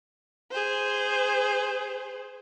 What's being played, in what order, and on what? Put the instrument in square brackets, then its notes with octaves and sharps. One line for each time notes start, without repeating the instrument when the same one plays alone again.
[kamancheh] G#4 C5